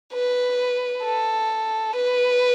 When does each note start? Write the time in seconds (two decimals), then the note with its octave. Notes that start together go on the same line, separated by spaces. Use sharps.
0.12 B4
1.03 A4
1.94 B4